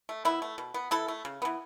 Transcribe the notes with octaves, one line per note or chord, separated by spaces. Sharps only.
A3
E3 B3 E4
A3
B2
B3
E3 E4 A4
A3
C#3
E3 B3